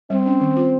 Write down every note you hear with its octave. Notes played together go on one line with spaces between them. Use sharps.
G3 C4
C#4
D#3
F4